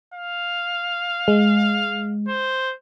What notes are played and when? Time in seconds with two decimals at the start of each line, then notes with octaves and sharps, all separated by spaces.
0.14 F5
1.28 G#3
2.28 C5